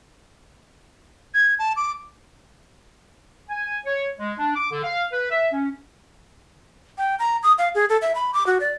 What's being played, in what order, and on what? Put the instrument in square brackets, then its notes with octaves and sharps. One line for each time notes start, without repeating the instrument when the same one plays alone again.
[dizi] G#6
A5
D6
[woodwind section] G#5
C#5
G#3
D4
D6
D3
F5
B4
E5
C#4
[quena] G5
A#5
D#6
F5
G#4
A4
E5
B5
D6
F#4
D5